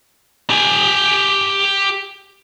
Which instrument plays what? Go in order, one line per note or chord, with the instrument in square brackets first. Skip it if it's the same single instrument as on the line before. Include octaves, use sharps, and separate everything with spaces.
[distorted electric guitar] G4 G#5